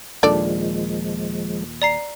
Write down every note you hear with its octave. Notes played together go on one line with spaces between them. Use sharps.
D#2 A#2 D#3 F3 G#3 D4 A4 D5
D5 A#5 C7